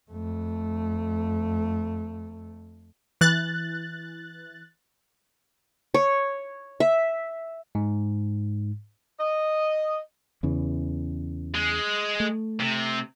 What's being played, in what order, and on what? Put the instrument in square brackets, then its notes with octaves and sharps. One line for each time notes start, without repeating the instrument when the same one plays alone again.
[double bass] F2 A3
[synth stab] E3 F#6 A6
[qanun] C#5
E5
[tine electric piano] G#2
[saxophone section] D#5
[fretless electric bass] E2 C#3 E3
[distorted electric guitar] G#3
[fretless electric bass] A3
[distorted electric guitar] C3